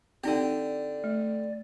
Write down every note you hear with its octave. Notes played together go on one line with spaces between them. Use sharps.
D3 C4 D#4 G4 D5
A3